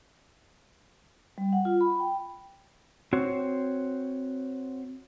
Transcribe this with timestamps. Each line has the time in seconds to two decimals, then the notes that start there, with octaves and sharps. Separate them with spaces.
1.38 G3
1.53 F#5
1.65 F4
1.81 B5
2.00 G5
3.13 C4 F#4 C5 C#5